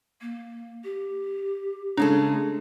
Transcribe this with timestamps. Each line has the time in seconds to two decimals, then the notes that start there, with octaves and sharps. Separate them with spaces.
0.21 A#3
0.84 G4
1.97 C#3 G#3 D4 A4
2.26 A3